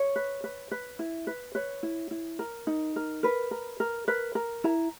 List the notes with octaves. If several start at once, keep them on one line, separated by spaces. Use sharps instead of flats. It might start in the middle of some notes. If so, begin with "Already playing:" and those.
Already playing: C#5
B4
B4
B4
E4
B4
B4 C#5
E4
E4
A#4
D#4
A#4
A#4 B4
A#4
A#4
A#4 B4
A#4
E4 A#5